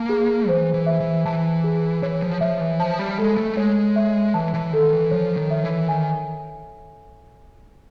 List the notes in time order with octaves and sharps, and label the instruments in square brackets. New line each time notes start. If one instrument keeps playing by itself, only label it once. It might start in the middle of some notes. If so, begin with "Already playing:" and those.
Already playing: [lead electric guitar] A#3 [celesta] A5
[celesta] G#4
[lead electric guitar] E3 [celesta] C5
[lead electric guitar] E3
[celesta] E5
[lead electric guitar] E3
[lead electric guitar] E3 [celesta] A5
[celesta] G#4
[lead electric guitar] E3 [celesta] C#5
[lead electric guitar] F3
[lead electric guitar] F3 [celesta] E5
[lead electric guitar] E3
[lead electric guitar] F3 [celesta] A5
[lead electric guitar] G3
[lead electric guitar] G#3 [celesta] A4
[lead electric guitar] A3
[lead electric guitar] G#3 [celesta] C#5
[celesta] E5
[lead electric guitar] E3 [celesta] A5
[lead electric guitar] E3
[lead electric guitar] D#3 [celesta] A4
[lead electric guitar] E3
[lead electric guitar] F3 [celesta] C#5
[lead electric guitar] D#3
[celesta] E5
[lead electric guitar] E3
[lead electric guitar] D#3 [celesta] G#5